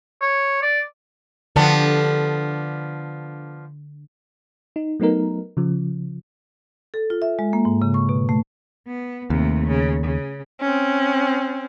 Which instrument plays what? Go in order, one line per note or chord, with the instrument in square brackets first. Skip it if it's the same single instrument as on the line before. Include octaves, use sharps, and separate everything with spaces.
[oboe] C#5
D5
[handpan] D3 [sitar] F3 B3 D4 [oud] G4 A4
[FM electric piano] D#4
F#3 A3 B3 D#4 A#4
C#3 F3
[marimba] A4
F4
E5
G#3
A#3
G#2
C#3
C#6
B2
A3
[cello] B3
[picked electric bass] D#2 [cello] C3 A3
[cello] C#3
C#3
[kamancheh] C4 C#4